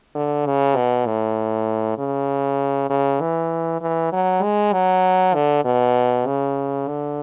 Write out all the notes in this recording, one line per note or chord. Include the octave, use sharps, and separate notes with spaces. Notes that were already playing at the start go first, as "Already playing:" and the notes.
D3
C#3
B2
A2
C#3
C#3
E3
E3
F#3
G#3
F#3
D3
B2
C#3
D3